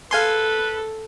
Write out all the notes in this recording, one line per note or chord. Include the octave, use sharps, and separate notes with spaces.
A4 B4 F5 G#5 C6